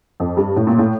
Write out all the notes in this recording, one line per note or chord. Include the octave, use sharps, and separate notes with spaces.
F2
G2
A2
A#2
A2